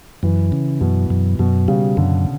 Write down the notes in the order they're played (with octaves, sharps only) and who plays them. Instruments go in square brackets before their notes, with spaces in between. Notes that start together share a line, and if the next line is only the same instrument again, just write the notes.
[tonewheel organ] F#2 [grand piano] E3
[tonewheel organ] C#3
[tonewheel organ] F#2 [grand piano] B2
[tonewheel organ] F#2
[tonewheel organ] F#2 [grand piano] B2
[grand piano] C#3 [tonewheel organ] G3
[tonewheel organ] F#2 [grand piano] D3